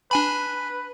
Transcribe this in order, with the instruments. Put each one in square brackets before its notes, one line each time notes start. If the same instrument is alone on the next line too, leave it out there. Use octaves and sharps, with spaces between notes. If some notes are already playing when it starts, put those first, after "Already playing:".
[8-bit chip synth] D4 G#5 B5 [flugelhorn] B4